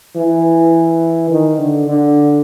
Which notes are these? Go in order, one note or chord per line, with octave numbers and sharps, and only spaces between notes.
E3
D#3
D3
D3